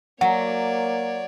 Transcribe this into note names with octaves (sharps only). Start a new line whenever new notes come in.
F#3 A#3 C#5 D5 F#5